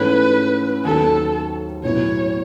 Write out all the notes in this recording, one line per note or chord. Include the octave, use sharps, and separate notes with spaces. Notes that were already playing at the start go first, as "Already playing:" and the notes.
Already playing: G#2 E3 A3 C#4 B4
D#2 D#3 F#3 B3 A4
B1 A2 F#3 B3 E4 C#5